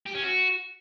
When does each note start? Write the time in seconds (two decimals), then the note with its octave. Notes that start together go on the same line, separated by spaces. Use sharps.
0.06 G4
0.15 C#4
0.23 F#4